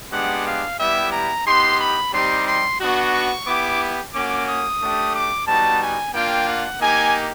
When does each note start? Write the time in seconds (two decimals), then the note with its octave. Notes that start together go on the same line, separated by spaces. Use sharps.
0.12 G#3 B3 D4 G4 F#5
0.46 F5
0.79 G3 B3 E4 G4 E5
1.12 A#5
1.46 B3 D#4 G4 C6
1.79 B5
2.13 G3 C4 D#4 G4 C6
2.47 C6
2.80 B3 D4 F#4
3.13 C#6
3.47 B3 E4 G4 D6
4.14 A#3 C#4 F#4 D6
4.48 D#6
4.81 A3 D4 G4
5.14 D6
5.47 G3 B3 D#4 F#4 A5
5.81 G#5
6.14 A#3 D4 F4 G5
6.48 F#5
6.81 A#3 D#4 G4 G#5